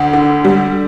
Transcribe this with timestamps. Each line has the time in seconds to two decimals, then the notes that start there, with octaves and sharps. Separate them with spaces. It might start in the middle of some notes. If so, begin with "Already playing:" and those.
Already playing: D2 D4
0.13 D3
0.45 G3